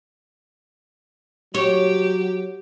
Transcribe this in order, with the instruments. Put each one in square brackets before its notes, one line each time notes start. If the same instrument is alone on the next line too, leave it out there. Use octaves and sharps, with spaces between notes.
[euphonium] F#3 [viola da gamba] G4 [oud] C#5